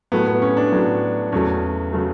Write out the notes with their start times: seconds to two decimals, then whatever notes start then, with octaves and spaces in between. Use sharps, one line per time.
0.12 A2 F#3 A3 B3
0.27 B3
0.42 C#4
0.57 D4
0.72 A2 F#3 A3
1.32 E2 C#3 F#3 A3 C#4
1.93 C#3 F#3 A3